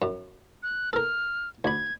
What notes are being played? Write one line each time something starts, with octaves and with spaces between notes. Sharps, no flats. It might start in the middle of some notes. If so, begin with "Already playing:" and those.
F#2
F#6
A4 A#4 F6
D2 B5 G#6